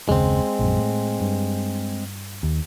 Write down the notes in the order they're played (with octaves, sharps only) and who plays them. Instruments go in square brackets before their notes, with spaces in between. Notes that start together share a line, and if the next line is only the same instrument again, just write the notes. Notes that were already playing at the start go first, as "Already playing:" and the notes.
[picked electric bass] F#1 D#2 C#3 [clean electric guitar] G#3 C4
[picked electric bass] A#1 F#2
A2
G2
D#2